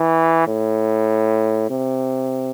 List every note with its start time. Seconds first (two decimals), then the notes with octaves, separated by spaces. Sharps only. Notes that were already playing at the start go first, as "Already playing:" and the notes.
Already playing: E3
0.47 A2
1.70 C3